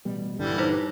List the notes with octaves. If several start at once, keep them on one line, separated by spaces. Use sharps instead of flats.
A1 B2 G3
A#1 G2 D3 E3 G3
D#4 B4 C5